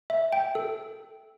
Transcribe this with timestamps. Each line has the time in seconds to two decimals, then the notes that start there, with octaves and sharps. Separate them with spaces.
0.10 E5
0.32 G5
0.55 A4